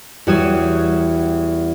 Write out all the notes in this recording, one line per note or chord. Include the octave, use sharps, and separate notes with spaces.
E2 G3 F#4 C#5 D#6 E7